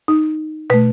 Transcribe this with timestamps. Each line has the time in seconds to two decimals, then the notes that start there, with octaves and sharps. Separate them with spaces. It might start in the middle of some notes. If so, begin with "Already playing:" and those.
0.08 D#4
0.70 B2 A3 B4